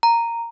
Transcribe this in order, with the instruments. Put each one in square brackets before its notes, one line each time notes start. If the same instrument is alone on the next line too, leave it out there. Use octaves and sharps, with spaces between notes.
[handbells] A#5